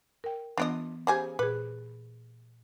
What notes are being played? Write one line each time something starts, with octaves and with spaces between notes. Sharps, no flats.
A#4 G5
E3 B3 D4 F4 D#5
C#3 G4 G#4 C5 G#5 D6
A#2 G#4 B4